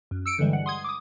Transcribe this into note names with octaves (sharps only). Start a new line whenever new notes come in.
F#2
E6 C#7 D7
G2 D3 E3 G3 G#3
F#5
C6 D#6 G#6
D6 D#6